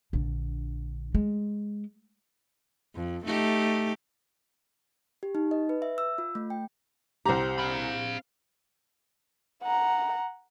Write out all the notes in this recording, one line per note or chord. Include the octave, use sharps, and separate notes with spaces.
A#1 D3
G#3
F2
A3 D#4 G4
G4
D#4
D#5
B4
E5
E6
F4
A3
G5
C2 C4 G4 A#5
F5 B5
F#5 A#5